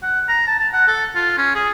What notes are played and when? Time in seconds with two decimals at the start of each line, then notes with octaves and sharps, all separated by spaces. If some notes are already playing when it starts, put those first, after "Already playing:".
0.02 F#5
0.28 A#5
0.47 A5
0.59 A5
0.73 F#5
0.87 A4
1.15 F4
1.37 C#4
1.55 G#4